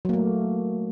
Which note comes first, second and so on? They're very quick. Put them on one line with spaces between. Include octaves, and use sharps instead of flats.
F#3 A#3 A3